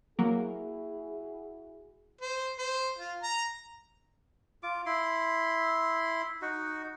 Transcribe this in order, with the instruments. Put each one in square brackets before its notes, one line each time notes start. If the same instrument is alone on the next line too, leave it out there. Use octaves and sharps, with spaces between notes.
[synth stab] F#3 A#3 [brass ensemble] E4 F#4 G#4
[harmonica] C5
C5
F4
A#5
[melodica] F4 D6
E4 C6
D#4 F#4